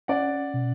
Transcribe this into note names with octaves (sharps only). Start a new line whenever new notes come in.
C#4 D5 F#5
B2